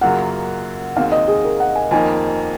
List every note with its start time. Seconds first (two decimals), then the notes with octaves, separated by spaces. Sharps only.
0.01 F#2 C#3 F#3 A#3 F4 F#5
0.96 D#2 D#3 G#3 C4 F#4 F5
1.12 D#5
1.28 G#4
1.45 A#4
1.60 F#5
1.75 G#5
1.91 F2 D#3 A#3 D#4 G#5